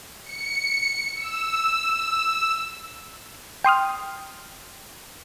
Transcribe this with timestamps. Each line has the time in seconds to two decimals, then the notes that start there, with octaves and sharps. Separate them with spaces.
0.21 C#7
1.14 E6
3.64 G5 C6 D#6 F6